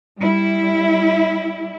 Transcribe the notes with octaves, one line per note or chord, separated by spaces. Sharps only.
G3 E4